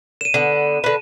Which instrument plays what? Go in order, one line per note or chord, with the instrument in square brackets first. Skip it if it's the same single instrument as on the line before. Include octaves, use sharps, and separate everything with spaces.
[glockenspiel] D#7 E7
[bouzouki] D3 B3
D3 B4